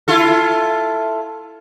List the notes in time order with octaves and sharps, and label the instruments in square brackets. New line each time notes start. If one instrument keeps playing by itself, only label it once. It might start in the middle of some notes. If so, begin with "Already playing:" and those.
[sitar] E4 F4 A4